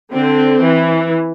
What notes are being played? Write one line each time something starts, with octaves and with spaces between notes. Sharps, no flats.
D3 C4
E3